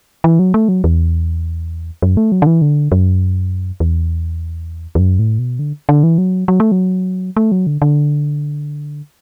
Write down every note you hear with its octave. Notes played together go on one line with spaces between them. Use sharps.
E3
F#3
A3
F#3
E2
F#2
A3
F#3
D3
E3
D3
F#2
E2
E2
F#2
A2
B2
D3
D3
E3
F#3
F#3
A3
F#3
A3
F#3
D3
D3